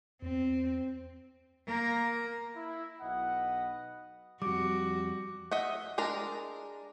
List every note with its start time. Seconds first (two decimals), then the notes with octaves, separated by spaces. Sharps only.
0.22 E2 C4
1.66 A#3 A#4
2.56 E4
3.01 B1 B4 D#5 F#5
4.42 F2 G3 F#4 D6
5.52 D#5 E5 F#5
5.98 G#3 D4 A#4 A#5